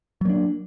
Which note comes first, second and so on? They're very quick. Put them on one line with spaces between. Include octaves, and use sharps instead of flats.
F#3 A#3 D4